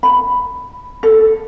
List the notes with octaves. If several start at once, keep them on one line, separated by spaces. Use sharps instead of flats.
B5
A4